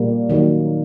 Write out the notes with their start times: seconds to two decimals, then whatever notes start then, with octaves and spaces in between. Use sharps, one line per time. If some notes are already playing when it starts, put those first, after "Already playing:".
Already playing: A#2 G3 A#3
0.30 D#3 F#3 A#3